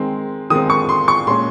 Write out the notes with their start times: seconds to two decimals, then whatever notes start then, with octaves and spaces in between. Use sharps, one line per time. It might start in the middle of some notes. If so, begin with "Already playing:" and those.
Already playing: D#3 G#3 C4
0.50 D#3 G#3 C4 D#6
0.70 C#6
0.89 C6
1.08 C#6
1.27 A#2 G#3 C#4 C6